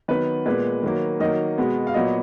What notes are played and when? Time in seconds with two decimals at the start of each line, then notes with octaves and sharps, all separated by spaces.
0.08 D#3 F#3 B3 B4
0.46 A#2 G#3 B3 B4
0.83 D#3 F#3 A#3
1.20 D#3 F#3 A#3 D#5
1.58 B2 G#3 B3
1.87 F5
1.94 A#2 F#3 B3 D#5